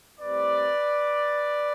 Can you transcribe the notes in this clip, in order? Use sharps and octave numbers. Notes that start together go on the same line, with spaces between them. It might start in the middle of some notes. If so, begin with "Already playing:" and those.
A2 G3 C4 B4 D5